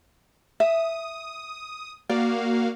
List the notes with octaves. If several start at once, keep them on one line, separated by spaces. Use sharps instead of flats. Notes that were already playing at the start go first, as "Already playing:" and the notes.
E5 D#6
A#3 F#4 D5 F5